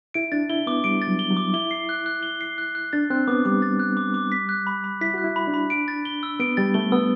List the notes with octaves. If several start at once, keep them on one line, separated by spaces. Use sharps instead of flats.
E4 D7
D4 A6
E4 G7
B3 D6
G3 D7
A6
F#3
G7
F#3
D6
E4 G7
C7
F#6
F#6
G7
C7
F#6
F#6
D4 A6
C4 F#6
B3 D6
G3 D6
A6
F#6
D6
D6
B6
F#6
B5
B5
E4 B6
F#4 F#6
E4
B5
D4
B5
D7
A6
G7
E6
B3 D7
G3 A6
A3 G7
B3 E6